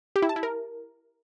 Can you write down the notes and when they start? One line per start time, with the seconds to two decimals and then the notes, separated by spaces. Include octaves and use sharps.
0.16 G4
0.22 E4
0.29 A5
0.36 E4
0.43 A#4